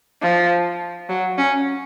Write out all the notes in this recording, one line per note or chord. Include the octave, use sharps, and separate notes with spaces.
F3
F#3
C#4